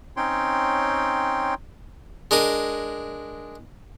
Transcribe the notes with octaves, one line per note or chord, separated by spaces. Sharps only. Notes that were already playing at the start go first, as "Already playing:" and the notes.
C4 C#4 D#4 C#5 G5 C6
G#3 D4 A#4 D#6